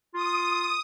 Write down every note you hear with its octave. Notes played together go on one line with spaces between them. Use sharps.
F4 D#6